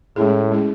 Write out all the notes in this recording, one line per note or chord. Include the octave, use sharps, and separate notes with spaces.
A2 G#3 C#4 E4 G#4
G#3 C#4 E4 G#4